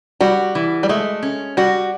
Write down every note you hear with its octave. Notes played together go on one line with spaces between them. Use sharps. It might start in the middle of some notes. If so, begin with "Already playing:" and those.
G3 F#4
E3
G3
G#3 A3
C#4
G3 F#4